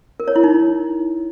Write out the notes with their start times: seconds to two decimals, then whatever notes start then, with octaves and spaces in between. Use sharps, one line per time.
0.20 A#4
0.28 C#5
0.36 E4
0.44 D#4